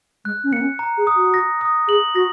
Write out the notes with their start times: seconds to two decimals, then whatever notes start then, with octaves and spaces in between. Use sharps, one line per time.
0.25 G#3 F#6
0.44 C#4
0.53 A#3 C#7
0.61 C#4
0.79 A#5
0.98 G#4
1.07 D#6
1.16 F#4
1.34 A#6
1.61 D#6
1.88 G#4 F#7
2.15 F#4 A#6